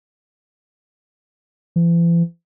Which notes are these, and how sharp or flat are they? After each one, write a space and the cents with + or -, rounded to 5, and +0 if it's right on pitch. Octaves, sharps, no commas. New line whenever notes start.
E3 +45